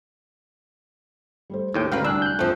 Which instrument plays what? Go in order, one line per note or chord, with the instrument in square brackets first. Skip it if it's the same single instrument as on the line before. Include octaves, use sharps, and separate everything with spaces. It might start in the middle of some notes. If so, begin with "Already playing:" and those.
[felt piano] G3 A3 C5
[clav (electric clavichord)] D#2 A2 G5 [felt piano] G4
[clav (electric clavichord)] D2 F5 G5 [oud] D#3 B4 [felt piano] G#3 C#4 D4
[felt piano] C2 G#5 [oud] D4 [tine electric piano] E6 F#6
[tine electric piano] F#6 G6
[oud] F2 F3 [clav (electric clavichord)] A3 C4